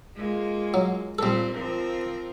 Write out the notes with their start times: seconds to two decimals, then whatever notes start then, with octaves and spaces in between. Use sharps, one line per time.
0.16 G#3 A#3 F4
0.74 F#3
1.19 A#2 G3 C4 A4
1.53 F3 C4 A#4